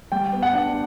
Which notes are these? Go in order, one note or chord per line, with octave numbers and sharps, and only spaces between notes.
G3 G5
B3
F#5
D4